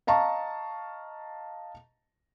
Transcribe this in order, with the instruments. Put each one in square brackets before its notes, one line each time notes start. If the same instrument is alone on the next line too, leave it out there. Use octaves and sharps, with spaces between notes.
[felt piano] D#5 F5 A5 A#5 C#6